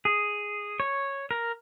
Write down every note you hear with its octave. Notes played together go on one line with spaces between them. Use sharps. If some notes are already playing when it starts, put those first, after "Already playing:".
G#4
C#5
A#4